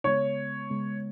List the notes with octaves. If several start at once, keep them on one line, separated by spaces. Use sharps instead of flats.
C#3 G#3 B3 C#5
C#3 G#3 B3